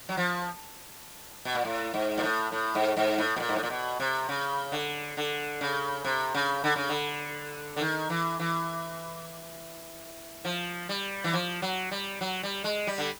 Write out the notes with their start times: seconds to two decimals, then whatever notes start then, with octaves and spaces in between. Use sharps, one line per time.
0.09 F#3
0.17 F3
1.45 B2
1.55 A#2
1.65 A2
1.94 G#2
2.18 A#2
2.23 A2
2.52 A2
2.75 G#2
2.97 G#2
3.18 A2
3.36 B2
3.40 A#2
3.49 G#2
3.56 A2
3.63 A#2
3.70 B2
4.00 C3
4.29 C#3
4.72 D3
5.17 D3
5.61 C#3
6.04 C3
6.34 C#3
6.64 D3
6.76 C#3
6.89 D3
7.76 D3
7.81 D#3
8.10 E3
8.39 E3
10.45 F3
10.89 G3
11.24 E3
11.33 F3
11.62 F#3
11.91 G3
12.21 F#3
12.43 G3
12.64 G#3
12.87 G3
12.98 D3